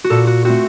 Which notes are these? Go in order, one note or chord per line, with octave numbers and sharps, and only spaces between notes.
F#4
A#2 A4
F#4
A3 C4 F#4